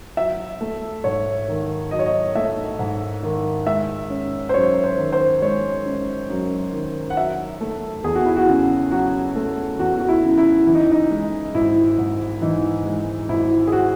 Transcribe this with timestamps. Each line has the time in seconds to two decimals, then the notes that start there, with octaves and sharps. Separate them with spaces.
0.17 F#3 E5
0.61 A3
1.04 G#2 C#5
1.48 D#3
1.91 F#3 D#5
1.99 C#5
2.06 D#5
2.35 A3 E5
2.79 G#2
3.23 D#3
3.66 G#3 E5
4.10 C#4
4.49 C5
4.54 F#2 C#5
4.84 C5
4.98 D#3
5.12 C5
5.42 G#3 C#5
5.86 C#4
6.30 F#2
6.73 D#3
7.10 F#5
7.17 F#3 E5
7.61 A3
8.04 E2 G#4
8.15 F#4
8.26 E4
8.37 F#4
8.48 C#3
8.91 F#3 F#4
9.36 A3
9.79 E2 F#4
9.99 F#4
10.08 E4
10.23 C#3
10.38 E4
10.67 E3 E4
10.75 D#4
10.92 D#4
11.11 G#3
11.54 G#1 E4
11.98 G#2
12.42 E3 D#4
12.85 G#3
13.29 G#1 E4
13.67 G#4
13.72 F#4